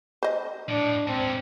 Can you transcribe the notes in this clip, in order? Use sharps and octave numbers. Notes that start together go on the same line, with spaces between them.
C5 D#5
A2 D4
G#2 C4 C#4